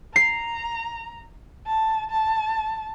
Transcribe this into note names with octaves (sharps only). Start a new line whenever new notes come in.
A#5 C7
A5
A5